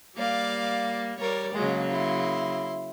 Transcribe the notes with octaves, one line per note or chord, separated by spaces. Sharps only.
G3 A#3 D5 F5
G3 A#4 C#5 D5
C#3 F#3 G#3 A#3
E4 C6